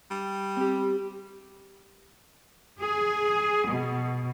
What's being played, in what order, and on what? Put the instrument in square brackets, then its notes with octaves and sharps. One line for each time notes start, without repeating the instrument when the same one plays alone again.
[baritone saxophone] G3
[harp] C4 G4
[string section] G#4
B2